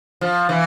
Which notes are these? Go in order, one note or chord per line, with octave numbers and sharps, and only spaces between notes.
F3
E3